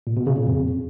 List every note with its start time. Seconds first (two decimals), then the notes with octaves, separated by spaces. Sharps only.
0.07 A#2
0.17 B2
0.27 C#3
0.37 A#2
0.47 F2